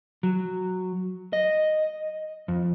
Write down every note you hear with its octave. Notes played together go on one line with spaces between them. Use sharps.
F#3
D#5
F2